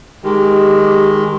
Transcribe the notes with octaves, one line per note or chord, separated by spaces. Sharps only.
D#3 G#3 G4